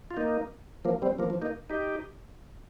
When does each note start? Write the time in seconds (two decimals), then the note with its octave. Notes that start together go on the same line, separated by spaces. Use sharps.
0.11 F4
0.17 A#3 D#4
0.85 F3 A#3
1.02 G3 C4
1.19 F3 A#3
1.30 F3
1.42 A#3 D#4
1.70 D#4 G4